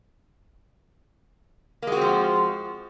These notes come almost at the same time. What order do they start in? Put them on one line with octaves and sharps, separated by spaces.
A#3 G#3 F#4 C4 F3